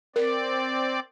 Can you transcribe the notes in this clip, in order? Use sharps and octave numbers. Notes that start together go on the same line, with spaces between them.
C4 A#4 D5